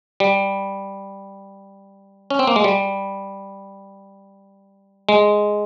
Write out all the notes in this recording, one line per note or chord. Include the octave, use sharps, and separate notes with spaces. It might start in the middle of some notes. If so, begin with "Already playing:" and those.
G3
C#4
C4
A#3
G#3
G3
G#3